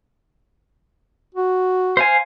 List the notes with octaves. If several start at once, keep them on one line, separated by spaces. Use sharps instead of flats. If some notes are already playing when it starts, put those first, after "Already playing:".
F#4
C5 F5 G#5